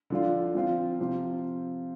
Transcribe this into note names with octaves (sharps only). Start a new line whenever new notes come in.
D3 F3 D4 F4
F3 C4 F4
C3 F3 C4 F4